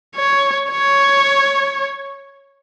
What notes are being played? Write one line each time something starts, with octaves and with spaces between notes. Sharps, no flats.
C#5
C#5